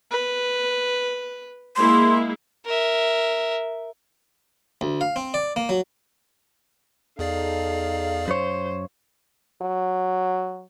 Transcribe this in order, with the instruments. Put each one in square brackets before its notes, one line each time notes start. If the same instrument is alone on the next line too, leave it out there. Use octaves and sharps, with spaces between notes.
[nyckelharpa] B4
[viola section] G#3 A#3 E4 [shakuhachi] C6
[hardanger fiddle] A#4 E5
[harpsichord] D2
F5
C4
D5
A#3
F#3
[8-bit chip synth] E2 G#4 D5 [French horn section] D#4 A4 [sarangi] F5
[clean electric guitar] F#2 C#5 [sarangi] C5
[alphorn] F#3